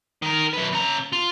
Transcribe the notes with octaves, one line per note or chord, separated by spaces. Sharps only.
D#3 A#4
F#2 B4
C#3 A#5
F4